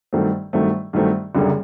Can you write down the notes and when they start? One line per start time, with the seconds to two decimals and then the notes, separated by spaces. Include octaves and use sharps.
0.13 G2 D#3 F#3 A3 C4
0.53 G2 D#3 F#3 A3 C4
0.93 G2 D#3 F#3 A3 C4
1.35 F#1 F#2 D3 G3 A#3